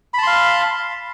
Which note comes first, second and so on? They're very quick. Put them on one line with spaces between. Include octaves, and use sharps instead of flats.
B5 A5 C6 F5